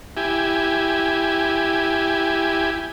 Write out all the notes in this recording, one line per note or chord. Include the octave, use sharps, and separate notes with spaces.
E4 G4 G#5